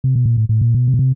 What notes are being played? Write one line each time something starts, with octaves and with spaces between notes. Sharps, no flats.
C3
B2
A#2
A2
A2
A#2
B2
C3
B2
C3